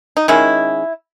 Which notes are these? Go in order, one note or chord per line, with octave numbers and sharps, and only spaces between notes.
D#4
D#3 G#3 C#4 E4